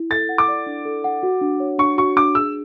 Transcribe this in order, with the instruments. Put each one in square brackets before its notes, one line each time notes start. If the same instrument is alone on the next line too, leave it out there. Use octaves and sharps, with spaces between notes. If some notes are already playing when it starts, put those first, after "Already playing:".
Already playing: [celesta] E4
[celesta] A4 [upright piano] A6
[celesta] F#5
[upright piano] D6
[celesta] D5
D4
A4
F#5
F#4
D4
C#5
[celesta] D4 [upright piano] C#6
[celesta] F#4 [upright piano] C#6
[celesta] D4 [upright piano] D6
[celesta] G#4 [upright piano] E6